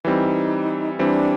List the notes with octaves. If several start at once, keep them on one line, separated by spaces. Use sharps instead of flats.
E3 G3 C4 D#4
E3 G3 C4 D4